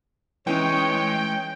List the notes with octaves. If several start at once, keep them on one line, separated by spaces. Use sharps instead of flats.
E3 G#3 C#4 D#4 C#5 G5